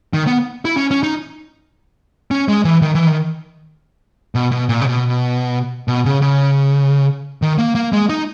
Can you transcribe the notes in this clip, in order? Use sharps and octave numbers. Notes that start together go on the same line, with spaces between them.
D#3
B3
E4
C#4
C#4
D#4
C#4
G#3
E3
D#3
E3
D#3
B2
B2
A#2
C#3
B2
B2
C#3
C#3
D#3
A#3
A#3
G#3
D#4